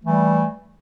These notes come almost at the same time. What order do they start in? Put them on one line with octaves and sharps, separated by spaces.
A3 E3 G3